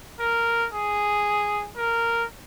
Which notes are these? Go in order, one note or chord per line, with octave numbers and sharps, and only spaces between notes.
A#4
G#4
A#4